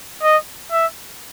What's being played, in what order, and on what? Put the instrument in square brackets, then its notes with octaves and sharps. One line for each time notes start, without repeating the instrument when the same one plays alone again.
[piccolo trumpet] D#5
E5